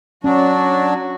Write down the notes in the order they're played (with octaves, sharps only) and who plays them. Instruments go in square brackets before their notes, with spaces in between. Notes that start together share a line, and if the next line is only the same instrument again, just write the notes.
[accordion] F#3 D4 [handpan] C#4 [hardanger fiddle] F#4